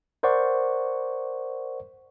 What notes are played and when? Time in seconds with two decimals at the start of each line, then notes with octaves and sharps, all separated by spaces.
0.23 A#4 C5 D5 F#5 C#6